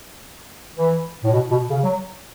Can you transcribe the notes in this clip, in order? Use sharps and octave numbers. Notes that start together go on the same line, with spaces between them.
E3
A2
B2
B2
C#3
F#3